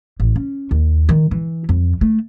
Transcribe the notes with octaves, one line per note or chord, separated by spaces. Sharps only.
A1
C#4
D#2
D#3
E3
F2
A3